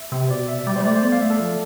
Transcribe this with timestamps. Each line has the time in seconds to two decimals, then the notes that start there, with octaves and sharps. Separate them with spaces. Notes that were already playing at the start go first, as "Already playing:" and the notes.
Already playing: E5
0.12 C3
0.30 B2 D5
0.48 E5
0.67 G3 D5
0.76 C5
0.80 G3
0.85 A3 D5
0.94 C5
1.03 B3 D5
1.12 F5
1.21 A3 E5
1.30 A4
1.39 F3